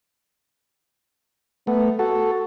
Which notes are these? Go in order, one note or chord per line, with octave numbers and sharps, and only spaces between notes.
A3 B3
F#4 A4